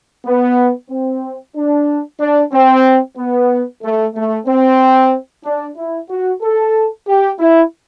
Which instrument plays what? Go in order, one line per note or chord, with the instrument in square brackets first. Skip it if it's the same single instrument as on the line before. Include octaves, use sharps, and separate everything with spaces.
[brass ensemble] B3
C4
D4
D4
C4
B3
A3
A3
C4
D4
E4
F#4
A4
G4
E4